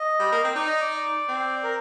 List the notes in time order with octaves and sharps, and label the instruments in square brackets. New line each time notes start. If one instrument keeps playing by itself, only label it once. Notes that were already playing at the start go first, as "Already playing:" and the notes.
Already playing: [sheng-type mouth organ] D#5
[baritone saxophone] G3
A#3
C4
[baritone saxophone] D#4 [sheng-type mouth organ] D5
[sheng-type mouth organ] D#5
D5
[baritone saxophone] C4
[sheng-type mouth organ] A#4